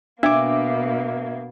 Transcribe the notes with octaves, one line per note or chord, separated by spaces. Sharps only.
B2 A#3 D4 E5 D6